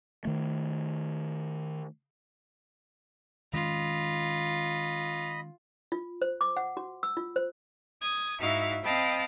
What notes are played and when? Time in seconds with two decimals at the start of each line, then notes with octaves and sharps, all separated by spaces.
0.25 D#3 A3
3.53 D#3 G#3 C#4 F4 D#5 B5
5.92 F4
6.22 C5
6.41 D6
6.57 F#5
6.77 F#4
7.03 E6
7.17 F4
7.36 C5
8.01 D#6 G#6
8.39 G#2 D#4 E4 F#4 E5 F5
8.83 C4 D#5 F5 G5 A5 B5